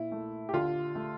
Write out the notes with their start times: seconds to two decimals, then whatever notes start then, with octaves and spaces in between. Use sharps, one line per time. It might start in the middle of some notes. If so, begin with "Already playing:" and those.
Already playing: A#2 E4
0.12 A3
0.49 G4
0.54 D3 F4
0.95 A3